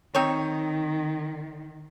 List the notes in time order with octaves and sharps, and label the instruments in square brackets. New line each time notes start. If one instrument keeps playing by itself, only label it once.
[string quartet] D#3 [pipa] C4 D#4 C#5